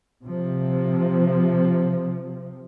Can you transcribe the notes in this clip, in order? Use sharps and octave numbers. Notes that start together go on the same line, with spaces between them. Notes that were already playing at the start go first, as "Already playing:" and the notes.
C3 F3